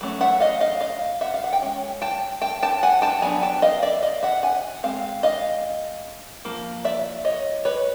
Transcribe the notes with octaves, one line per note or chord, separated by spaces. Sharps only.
F#3 A3 C#4
E5 F#5
D#5 F5
D#5 F5
D#5 F5
E5 F#5
F5
F#5
G5
G#3 C#4
G5 A5
G5 A5
G5 A5
F#5 G#5
G5 A5
F#3 B3 D4 G#5 A#5
G5 A5
D#5 F5
D5 E5
D#5 F5
E5 F#5
F#5 G#5
G#3 C4 F5
D#5 F5
F3 A#3
D5 E5
C#5 D#5
B4 C#5